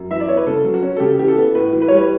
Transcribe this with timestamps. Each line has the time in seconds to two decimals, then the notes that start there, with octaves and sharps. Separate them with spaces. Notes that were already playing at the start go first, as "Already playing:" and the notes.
Already playing: F#2
0.11 E3 E5
0.20 D5
0.28 B3 C#5
0.37 B4
0.47 C#3 A4
0.64 F#3
0.74 F#4
0.82 C#4
0.96 A4
1.00 C#3 G4
1.19 E3 G4
1.28 A4
1.36 B3
1.55 A2 B4
1.73 E3
1.82 B4
1.88 G3 C#5
1.97 B4